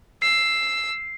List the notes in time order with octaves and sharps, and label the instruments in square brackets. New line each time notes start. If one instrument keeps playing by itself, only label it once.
[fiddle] E6 [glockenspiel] C7